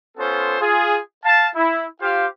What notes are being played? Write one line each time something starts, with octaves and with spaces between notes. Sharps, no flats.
B3 C#4 F4 A4 C5
F4 G#4
F5 A5
E4
F4 G4 C5 F5